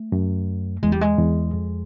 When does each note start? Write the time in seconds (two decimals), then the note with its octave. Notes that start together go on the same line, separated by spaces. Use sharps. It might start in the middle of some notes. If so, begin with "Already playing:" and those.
Already playing: A3
0.12 F#2
0.83 E2 G#3
0.92 G3
1.01 G#3
1.18 E2
1.53 F2